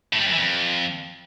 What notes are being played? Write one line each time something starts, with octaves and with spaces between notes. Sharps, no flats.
A2
G3
F#2
E3
F2